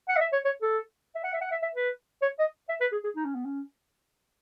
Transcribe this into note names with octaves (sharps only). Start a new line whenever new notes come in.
F#5
D#5
E5
C#5
C#5
A4
E5
F#5
E5
F#5
E5
E5
B4
C#5
D#5
E5
B4
G#4
G#4
D#4
C#4
B3
C#4